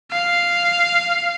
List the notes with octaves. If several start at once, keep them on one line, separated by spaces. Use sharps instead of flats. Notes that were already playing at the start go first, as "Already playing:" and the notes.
F5